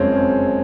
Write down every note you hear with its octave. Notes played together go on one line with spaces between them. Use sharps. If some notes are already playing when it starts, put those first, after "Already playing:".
Already playing: F#1 F2 C#3 G#3 C4 C#4